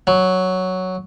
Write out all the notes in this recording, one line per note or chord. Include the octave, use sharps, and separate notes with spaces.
F#3